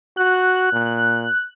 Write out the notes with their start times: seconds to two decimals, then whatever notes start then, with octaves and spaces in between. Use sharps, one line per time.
0.17 F#4 F#6
0.73 A#2